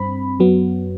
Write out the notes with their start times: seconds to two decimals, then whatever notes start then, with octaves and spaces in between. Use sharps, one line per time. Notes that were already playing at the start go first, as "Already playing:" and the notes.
Already playing: G2 C4 B5
0.39 F#2 F#3 B3